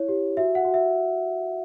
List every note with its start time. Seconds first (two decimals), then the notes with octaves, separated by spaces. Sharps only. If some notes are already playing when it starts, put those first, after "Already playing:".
Already playing: E4 C#5
0.08 G4
0.37 F#4 E5
0.55 F#5
0.65 F#4
0.74 E5